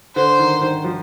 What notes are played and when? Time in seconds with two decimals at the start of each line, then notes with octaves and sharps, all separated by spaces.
0.15 D3 C5
0.39 D#3
0.61 D#3
0.84 F3